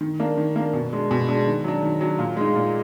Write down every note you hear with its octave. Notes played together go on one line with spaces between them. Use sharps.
D#3
A#3 D4
D#3
A#3 D4
B2
G#3 D4
B2
G#3 D4
D#3
F#3 D4
D#3
F#3 D4
A#2
G#3 D#4
A#2